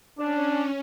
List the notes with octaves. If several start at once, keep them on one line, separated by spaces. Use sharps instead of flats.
C#4 D4